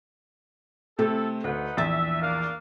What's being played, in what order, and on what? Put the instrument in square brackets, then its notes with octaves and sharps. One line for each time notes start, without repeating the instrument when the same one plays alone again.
[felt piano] C3 A3 [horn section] E4 A4
[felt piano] D2 [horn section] D#4 B4 F#5
[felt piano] A#1 E2 A6 [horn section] E5
[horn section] A#3 D4 F5